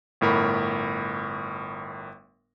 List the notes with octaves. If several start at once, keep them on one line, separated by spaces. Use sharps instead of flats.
G1 A2 A#4 B5